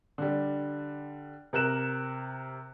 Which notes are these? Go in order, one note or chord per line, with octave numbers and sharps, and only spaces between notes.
D3 G3
C3 A#4 F#6 E7